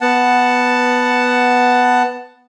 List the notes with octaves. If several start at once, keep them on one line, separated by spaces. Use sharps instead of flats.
B3 F#5 A5